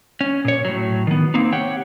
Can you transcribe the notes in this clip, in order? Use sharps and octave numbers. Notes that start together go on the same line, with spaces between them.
C#4
A#2 C#5
A2 F#3
D#3 B3
A#3 C4 D#4
G4 C#5 F#5 G5